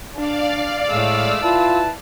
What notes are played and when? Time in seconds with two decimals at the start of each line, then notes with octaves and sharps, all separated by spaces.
0.16 D4 D5 F5
0.90 A2 G#3 A3 E6
1.41 E4 F4 B4 A5